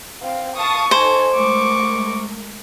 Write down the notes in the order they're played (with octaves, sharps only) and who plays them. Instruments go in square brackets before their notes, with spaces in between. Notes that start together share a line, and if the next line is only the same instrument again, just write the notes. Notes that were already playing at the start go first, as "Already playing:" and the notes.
[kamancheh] C4 F5
[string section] F5 A5 D#6 [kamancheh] C#6
[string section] D#4 A4 G#5 [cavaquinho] C5
[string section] G#3 A3 A#4 [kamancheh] C#6 D6